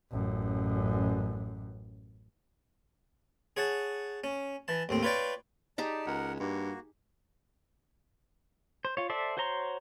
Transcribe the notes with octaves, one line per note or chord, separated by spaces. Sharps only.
A1 F#2
G#4 C#5 F#5 A5
C#4
E3 A5
D#2 A2 C4
F4 B4 C#5 D5 G5
D#4 G4 G#4 D5 A5
C#2 A#4 F#5
G2 A#3 F#4
C5
F4 C#5
A4 C5 D5 E5
F#4 C5 C#5 A#5 C6